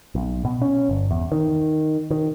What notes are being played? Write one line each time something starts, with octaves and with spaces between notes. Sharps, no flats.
B1
B2
C#4
G1
E2
D#3
D#3